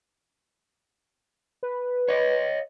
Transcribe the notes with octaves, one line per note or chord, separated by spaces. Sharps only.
B4
C#5 D#5